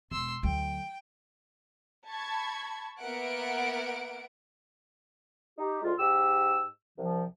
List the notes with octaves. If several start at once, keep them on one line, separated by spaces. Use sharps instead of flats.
E1 C6 E6
D2 F#3 G5
A5 B5 C#6 G#6
A#3 B3 A#4 E5 F#5 D7
D#4 G4
D2 G#3 F4
G#2 G4 E6
C2 F3